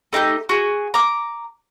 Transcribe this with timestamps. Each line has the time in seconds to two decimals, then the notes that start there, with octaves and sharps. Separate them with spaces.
0.13 A3 D#4 G4 G6
0.49 F#4 G#4
0.94 A#5 D6